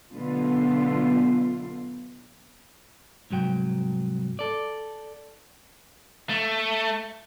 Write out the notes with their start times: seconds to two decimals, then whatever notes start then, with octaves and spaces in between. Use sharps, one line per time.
0.14 F#2 B2 D3 A3 B3 F4
3.30 C2 G#2 F#3 G5
4.39 A4 D5
6.30 A3